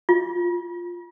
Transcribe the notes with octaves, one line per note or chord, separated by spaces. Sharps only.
F4